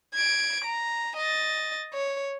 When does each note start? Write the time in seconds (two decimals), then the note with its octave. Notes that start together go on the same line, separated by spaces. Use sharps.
0.14 G#6 D7
0.64 A#5
1.17 D#5 A6
1.93 C#5